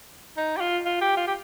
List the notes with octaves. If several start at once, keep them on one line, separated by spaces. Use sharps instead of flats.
D#4
G4
F4
F4
G4
F4
G4